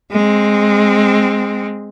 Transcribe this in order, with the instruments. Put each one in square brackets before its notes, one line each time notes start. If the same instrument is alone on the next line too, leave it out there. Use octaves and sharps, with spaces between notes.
[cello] G#3 C4